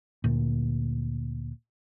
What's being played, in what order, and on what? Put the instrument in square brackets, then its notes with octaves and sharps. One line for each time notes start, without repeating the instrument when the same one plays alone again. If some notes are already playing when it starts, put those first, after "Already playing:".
[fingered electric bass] D2 A#2